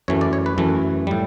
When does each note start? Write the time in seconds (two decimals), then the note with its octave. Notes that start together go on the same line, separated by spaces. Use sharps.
0.08 F#2 E3 A3 C#5
0.21 D5
0.33 C#5
0.46 B4
0.58 F#2 E3 A3
1.07 A2 G3